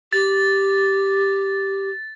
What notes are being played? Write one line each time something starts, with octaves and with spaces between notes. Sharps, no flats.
G4 A6